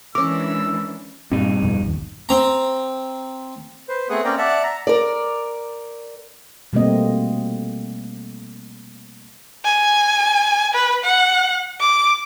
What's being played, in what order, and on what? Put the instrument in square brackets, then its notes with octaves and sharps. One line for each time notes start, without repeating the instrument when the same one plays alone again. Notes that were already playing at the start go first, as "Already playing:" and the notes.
[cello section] E3 G#3 D4 [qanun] C#4 A#4 [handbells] D6 [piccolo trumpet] E6
[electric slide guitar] G2 D#4 [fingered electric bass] A#2 C4
[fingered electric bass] F2 B2
A#1 D#2
[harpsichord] C4 A#5
[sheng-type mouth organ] B4 C5
A3 B3 C4 G#4 F#5 D#6
A#3 C4 C#4 D5 G5 A#5
D5 E5 F#5 A5
A#5
[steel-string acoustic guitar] A#4 D5
[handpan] B2 G3 A3 A#3 C4 D#5
[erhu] G#5
B4
F#5
D6